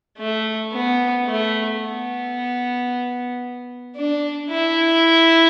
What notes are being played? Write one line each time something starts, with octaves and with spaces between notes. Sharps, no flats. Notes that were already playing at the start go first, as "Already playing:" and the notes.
A3
B3
A3
B3
D4
E4